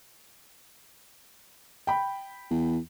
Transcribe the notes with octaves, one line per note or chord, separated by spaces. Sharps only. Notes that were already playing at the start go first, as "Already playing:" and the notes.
G5 B5
E2